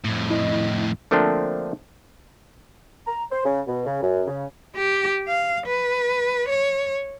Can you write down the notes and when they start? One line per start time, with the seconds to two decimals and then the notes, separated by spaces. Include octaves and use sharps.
0.05 F2 A2
0.30 E4 D#5
1.11 D3 F3 A3 A#3 C4 D4
3.07 A#5
3.31 C5
3.45 C#3
3.67 B2
3.86 C#3
4.02 F#2
4.28 C#3
4.76 G4
5.28 F5
5.67 B4
6.49 C#5